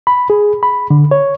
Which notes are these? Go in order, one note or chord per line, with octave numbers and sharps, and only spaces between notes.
B5
G#4
B5
D3
C#5